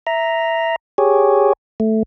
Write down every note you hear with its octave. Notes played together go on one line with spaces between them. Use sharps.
E5 A#5
G4 G#4 C#5
A3